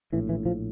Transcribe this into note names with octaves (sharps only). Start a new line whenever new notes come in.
A#1 A2 E3
E3
F3